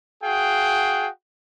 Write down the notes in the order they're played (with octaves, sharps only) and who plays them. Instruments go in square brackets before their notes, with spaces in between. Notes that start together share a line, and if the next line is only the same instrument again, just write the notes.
[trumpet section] F#4 G#4 F5 G5